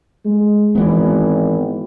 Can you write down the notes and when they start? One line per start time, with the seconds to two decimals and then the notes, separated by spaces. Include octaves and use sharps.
0.25 G#3
0.75 G#1 E3 B3